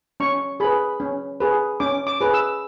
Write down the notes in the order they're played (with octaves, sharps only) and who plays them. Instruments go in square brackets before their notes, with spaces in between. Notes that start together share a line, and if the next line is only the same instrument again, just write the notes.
[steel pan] C#4 C#6
G#4 B4 B5
C#4
G#4 B4
C#4 D6
D6
G#4 B4
E6